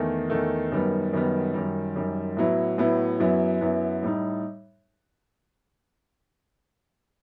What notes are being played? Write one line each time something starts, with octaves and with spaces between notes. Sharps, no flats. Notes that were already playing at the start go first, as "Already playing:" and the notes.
Already playing: E2 D#3 A3
E2 D#3 A3
F#2 D#3 G3 B3
F#2 D#3 G3 B3
F#2 D#3 G3
F#2 D#3 G3
A2 F#3 B3 E4
A2 F#3 B3 E4
F#2 F#3 B3 E4
F#2 F#3 B3 E4
A2 G3 D#4